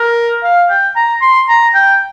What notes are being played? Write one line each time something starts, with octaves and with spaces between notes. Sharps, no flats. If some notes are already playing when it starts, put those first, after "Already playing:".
Already playing: A#4
F5
G5
A#5
C6
A#5
G5